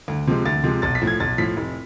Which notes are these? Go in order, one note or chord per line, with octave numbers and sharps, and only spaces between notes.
D2
C3 F3 G#3
D2 A6
C3 F3 G#3
B1 A6
B6
A2 F3
G#6
B1 A6
A2 F3 B6
F1